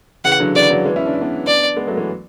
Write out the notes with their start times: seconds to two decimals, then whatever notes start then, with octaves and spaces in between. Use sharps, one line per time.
0.24 C#3 E3 F#5
0.40 D3 F#3
0.55 C#3 E3 D5
0.70 D3 F#3
0.85 E3 G#3
0.96 C#4 E4
1.06 D4
1.14 E4
1.21 B3 D4
1.47 D5
1.77 G#3 B3
1.87 F#3 A3
1.97 E3 G#3